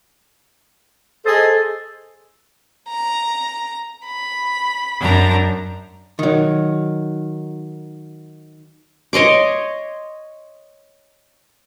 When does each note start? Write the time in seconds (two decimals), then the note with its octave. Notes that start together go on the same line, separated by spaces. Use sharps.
1.25 G#4 A4 C5 D#5
2.88 A#5
4.06 B5
4.99 F#2 D4 A#5
6.19 D#3 F#3
9.13 C#5 D#5 C6 D6